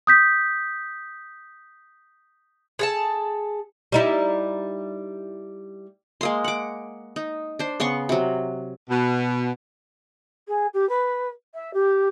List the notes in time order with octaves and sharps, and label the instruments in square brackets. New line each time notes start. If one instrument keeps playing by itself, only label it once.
[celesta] D#6 G6 B6
[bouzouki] G#4 A4 A5
[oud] G3 D#4 E4
[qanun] G#3 A#3 C6
F#5 D6
D#4
D4 C5
C#3 B3 C6 C#6
C3 F#3
[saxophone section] B2
[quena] G#4
G4
B4
E5
G4